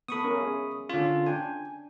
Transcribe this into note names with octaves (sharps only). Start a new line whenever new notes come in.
B3 A4 B5 C#6 D#6
C#4 A#4
G#4 E5
D3 C#4 F4
D4 G5 G#5